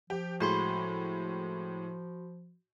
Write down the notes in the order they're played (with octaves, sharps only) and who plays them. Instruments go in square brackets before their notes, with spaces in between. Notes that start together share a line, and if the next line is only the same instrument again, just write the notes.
[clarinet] F3 [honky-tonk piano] G4
[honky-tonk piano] A2 G#3 [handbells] F#4 B5 C6